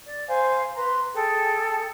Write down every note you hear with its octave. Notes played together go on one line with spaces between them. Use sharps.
D5
C5 F5 G#5
B4 A#5 C6
G#4 A4 G5